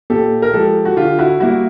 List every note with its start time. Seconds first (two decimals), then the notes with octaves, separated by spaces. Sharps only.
0.10 A#2 G4 A4
0.42 A#4
0.53 F3 G#3 G4 A4
0.85 F#4
0.96 D3 F4 G4
1.19 E4 F#4
1.40 G3 A#3 E4 F#4